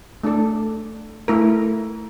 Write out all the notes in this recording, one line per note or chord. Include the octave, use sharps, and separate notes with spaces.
A3 D4 A4 D5
A3 E4 A#4